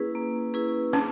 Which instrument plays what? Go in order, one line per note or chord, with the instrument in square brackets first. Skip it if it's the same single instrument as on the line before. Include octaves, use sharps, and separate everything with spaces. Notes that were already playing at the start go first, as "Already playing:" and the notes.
Already playing: [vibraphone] A#3 C#4 E4 G#4 B4
A#3
C#4 E4 G#4 B4
[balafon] C#4 [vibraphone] D4